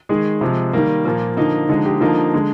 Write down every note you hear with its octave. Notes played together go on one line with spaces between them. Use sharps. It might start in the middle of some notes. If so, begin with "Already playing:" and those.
D#3 G#3 G#4
C3 F3 G#3
D#3 G3 A#3
A#2 F3 A#3
D3 F3 A#3 D#4
D3 F3 G#3 D#4
G4
D3 F3 A#3 D#4
D3 G#3